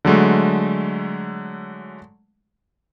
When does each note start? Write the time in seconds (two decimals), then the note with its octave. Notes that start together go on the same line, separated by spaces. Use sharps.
0.05 D3 F#3 G#3 A3